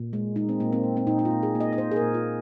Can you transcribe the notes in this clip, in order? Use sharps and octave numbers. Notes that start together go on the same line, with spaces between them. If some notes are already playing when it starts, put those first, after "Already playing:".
Already playing: A#2
G#3
G#3 D#4
C4
A#2 A#3
C4
A#2
C4
A#2 D#4
D#4
F4
A#2
G#4
A#3
D#5
D#5
A#3 C5
G#4
A#4
A#2
F4